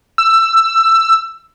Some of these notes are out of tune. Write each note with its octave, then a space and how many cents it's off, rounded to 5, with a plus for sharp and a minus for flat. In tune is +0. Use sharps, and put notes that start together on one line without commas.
E6 +15